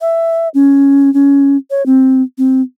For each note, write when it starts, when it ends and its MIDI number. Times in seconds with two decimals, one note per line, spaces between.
0.01 0.48 76
0.54 1.12 61
1.14 1.57 61
1.70 1.85 73
1.86 2.22 60
2.38 2.61 60